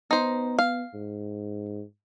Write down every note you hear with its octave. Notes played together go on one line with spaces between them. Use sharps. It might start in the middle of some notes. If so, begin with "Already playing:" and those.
B3 D#4 C5
F5
G#2